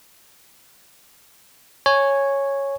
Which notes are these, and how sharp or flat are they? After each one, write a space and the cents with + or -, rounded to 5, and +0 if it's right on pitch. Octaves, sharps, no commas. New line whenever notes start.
C#5 -5 G#5 +0